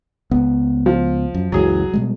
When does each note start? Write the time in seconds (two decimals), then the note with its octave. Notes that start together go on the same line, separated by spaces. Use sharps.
0.31 C#2 B3
0.86 F3
1.34 F#2
1.52 F#1 C#2 E3 F#3 G#4
1.94 B2 G3 G#3